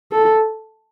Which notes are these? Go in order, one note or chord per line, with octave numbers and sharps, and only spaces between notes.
A4